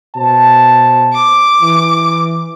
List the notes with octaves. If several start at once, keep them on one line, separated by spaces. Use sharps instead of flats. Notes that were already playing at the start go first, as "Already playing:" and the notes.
B2 C5 A5
D6
E3